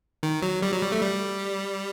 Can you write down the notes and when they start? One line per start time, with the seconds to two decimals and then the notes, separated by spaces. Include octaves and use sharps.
0.23 D#3
0.43 F#3
0.62 G3
0.73 F#3
0.82 G3
0.92 A3
1.02 G3